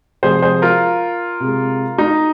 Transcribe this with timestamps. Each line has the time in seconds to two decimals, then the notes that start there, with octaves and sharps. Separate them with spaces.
0.23 C3 F3 G#3 G#4 C5
0.42 G#4 C5
0.62 F4 A#4
1.40 C3 G#3
1.98 D#4